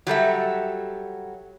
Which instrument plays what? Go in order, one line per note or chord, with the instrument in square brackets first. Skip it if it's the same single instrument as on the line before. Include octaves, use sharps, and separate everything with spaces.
[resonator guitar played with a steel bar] F#3 G3 A4 E5